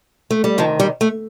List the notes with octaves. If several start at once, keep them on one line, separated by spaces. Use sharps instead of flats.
A3
G3
D2 C3 D#3 F3
G3
A3